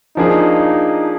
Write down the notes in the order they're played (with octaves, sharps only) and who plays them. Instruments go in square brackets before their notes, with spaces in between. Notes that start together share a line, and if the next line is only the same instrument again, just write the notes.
[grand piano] F3 A#3 D4 G#4 [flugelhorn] D#4